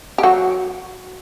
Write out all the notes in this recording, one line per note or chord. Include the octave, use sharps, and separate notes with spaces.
G4
F#3 F#4